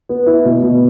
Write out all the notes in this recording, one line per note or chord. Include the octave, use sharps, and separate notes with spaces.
B3
E4
B2
B2